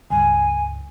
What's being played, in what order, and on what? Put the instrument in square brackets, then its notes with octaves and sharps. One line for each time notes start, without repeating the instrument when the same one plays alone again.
[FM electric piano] C#2 G2 [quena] G#5